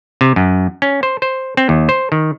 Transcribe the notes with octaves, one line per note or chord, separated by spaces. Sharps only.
C3
F#2
C#4
C5
C5
C4
D#2
C5
D#3